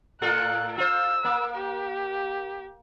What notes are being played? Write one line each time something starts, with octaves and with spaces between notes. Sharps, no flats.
A2 F4 A4 F#6
F4 C5 E6
A#3
G4